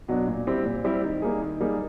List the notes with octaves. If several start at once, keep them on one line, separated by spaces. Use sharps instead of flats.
B2 F#3 B3 D4
A#2
G3 C4 E4 G4
A#2
G3 C4 E4 G4
D#3
G3 A#3 D#4 G#4
D#3
G3 A#3 D#4 G#4